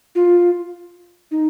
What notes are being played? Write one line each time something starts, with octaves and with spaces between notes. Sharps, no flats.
F4
D#4